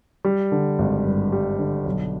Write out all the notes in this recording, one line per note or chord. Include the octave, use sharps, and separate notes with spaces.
G3
D3
G#1
G2
G3
D3
B1